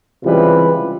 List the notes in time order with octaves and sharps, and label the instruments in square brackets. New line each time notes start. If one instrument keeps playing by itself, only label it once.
[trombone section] C#2 C3 E3 G3 F4 B4